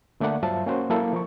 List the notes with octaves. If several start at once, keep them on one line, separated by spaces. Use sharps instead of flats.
D3 A3 A#3 D5 F#5
G2 F#3 F4 C5 E5 A5
A#3 C#4 F#4 C5
F#3 A#3 E4 A4 E5
F3 A#4 C#6